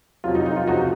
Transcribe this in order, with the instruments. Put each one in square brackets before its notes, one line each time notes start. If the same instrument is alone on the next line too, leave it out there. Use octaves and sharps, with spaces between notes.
[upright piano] F2 C3 F#3 [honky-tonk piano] F4
[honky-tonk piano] D#4
D#4
F4
[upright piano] C#2 C3 F3 G#3 [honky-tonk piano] D#4 F#4